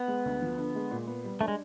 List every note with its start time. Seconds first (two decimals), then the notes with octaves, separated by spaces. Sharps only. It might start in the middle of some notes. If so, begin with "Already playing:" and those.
Already playing: B3
0.08 G#3
0.25 D2
0.42 F3
0.58 D3
0.75 G#3
0.91 A#2
1.07 B3
1.25 G3
1.41 A3 D4
1.48 G#3